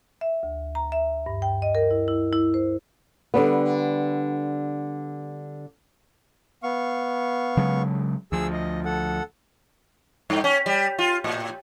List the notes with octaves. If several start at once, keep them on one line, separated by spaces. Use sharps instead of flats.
E5
D2
A#5
E5
G2
G5
D#5
A#4
E4
E4
E4
C5
D3 G3 B3
B3 F5 C#6
C#3 F#3 G#3
D2 F3 G#4 E6
D#5
A4 F#5
G2
C#4
G3
F4
A2